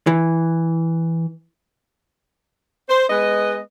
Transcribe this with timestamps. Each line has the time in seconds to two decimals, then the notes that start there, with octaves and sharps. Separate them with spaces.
0.07 E3
2.89 C5
3.08 G#3 B3 B4 D#5